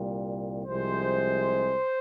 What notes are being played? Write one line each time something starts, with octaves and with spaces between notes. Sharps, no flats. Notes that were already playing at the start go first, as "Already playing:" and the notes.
Already playing: C2 A#2 G3
C2 C3 F3 G#3 C5